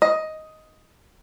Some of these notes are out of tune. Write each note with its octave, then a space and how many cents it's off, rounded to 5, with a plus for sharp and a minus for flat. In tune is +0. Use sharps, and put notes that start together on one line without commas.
D#5 +10